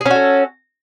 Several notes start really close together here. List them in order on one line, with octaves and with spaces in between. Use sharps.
G#4 C#4 F#4 A4